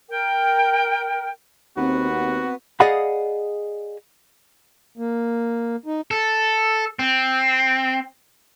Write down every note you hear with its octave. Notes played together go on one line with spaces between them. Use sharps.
A#4 G5
D#2 B3 C4 F#4 B4
C4
G#4 D5 D#5 F5 F#5 B5
A#3
D#4
A4
C4